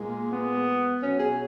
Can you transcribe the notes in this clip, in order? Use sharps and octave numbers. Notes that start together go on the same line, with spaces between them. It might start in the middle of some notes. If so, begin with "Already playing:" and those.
Already playing: A#2 G#3
A#3
B3
B2 F#3 C#4
G#4